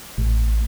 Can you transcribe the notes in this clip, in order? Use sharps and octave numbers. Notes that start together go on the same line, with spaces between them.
A1